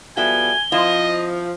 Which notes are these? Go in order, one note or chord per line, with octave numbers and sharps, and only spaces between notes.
F3 G3 B3 F#4 A4 E5 G#5 G7
F3 C4 E4 F4 D#5